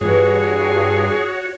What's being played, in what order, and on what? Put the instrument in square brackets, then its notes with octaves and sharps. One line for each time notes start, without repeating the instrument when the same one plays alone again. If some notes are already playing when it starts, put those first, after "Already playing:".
[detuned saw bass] G2 [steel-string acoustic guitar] E3 B3 E4 [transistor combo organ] F#4 C#5 [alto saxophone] G#4